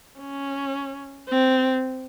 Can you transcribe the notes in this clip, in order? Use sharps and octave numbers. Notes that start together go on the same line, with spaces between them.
C#4
C4